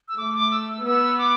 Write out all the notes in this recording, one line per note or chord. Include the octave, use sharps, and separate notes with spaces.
E6
A3 D6
D6
E6
B3 E6
D6